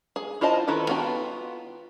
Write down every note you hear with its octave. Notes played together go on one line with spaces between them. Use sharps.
G#4
E4 F4 C5 D#5 A5
D#3 E4 A4 B4
B3 F4 F#4 G5 A5